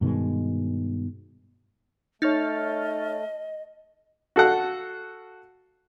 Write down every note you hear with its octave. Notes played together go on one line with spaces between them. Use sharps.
G2 B2 D#3 G#3
A3 D#4 C#5 D#5 F6 A6
F#4 A4 F5 F#5